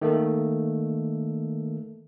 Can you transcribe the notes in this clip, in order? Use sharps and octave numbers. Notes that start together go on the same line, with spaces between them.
D#3 A3 A#3 A4